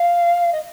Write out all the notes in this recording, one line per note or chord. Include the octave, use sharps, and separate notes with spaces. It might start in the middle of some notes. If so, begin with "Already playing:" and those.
Already playing: F5
D#5